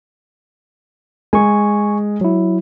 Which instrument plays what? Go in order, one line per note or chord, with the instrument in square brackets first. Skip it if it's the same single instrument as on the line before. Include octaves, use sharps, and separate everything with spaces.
[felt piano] G#3 [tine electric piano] G#5 C#6
[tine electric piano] F#3 E4